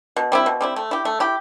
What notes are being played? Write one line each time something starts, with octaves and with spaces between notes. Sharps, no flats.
B2
G3 C4 E4
B2
G3 C4 E4
A3
E4 G4
A3
E4 G4